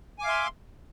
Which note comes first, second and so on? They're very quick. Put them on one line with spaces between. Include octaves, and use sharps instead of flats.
G#5 D6 F5 E5 C6